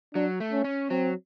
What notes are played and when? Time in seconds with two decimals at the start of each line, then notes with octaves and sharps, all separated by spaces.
0.15 F#3 D4
0.40 A3
0.52 C#4
0.64 C#4
0.90 F#3 C4